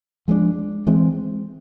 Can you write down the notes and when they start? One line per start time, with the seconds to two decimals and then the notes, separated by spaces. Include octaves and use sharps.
0.28 F3 G#3 B3 D4
0.87 E3 G#3 C4